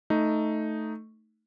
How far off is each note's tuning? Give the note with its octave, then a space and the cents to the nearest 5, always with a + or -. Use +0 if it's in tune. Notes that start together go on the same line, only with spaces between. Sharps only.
A3 +0 D#4 +0